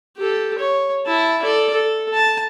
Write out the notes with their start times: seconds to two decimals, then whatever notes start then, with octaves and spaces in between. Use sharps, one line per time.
0.17 G4 A4
0.59 C#5
1.06 E4 A5
1.43 A4 D5
1.74 A4
2.14 A5